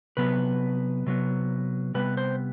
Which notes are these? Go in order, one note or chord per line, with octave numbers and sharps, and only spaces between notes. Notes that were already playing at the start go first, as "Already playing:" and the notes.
C3 F#3 B3 B4
C3 F#3 B3
C3 G3 B3 B4
C5